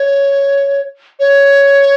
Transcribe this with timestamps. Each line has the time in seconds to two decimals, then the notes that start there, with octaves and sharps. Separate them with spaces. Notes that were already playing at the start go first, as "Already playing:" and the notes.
Already playing: C#5
1.20 C#5